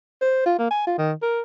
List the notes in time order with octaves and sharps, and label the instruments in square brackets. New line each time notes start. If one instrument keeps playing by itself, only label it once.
[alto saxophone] C5
F4
A#3
G#5
F4
D#3
A#4